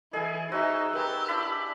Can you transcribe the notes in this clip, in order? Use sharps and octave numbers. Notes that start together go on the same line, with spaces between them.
E3 G#4 A4 D#5 G#5
D#4 F#4 C5 D#5 E5 E6
G4 A#4 B4 A5
D4 E4 B5